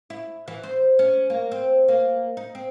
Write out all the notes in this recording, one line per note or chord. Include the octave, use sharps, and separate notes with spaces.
E4
E3
C5
C#4
A#3
C4
A#3
D#4
C4